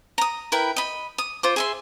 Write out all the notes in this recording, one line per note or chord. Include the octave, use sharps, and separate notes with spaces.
A#5 D#6
E4 A#4 B4 G5
D#5 B5
D#6
F4 C5 D6
G#4 E5 C6